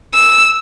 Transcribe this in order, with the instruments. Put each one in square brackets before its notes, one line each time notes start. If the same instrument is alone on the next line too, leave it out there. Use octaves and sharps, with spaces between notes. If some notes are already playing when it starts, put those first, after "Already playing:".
[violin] E6